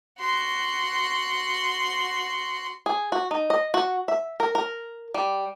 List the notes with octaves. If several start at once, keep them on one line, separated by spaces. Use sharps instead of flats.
F#4 C6
G#4
F#4
D#4
D#5
F#4
E5
A#4
A#4
G3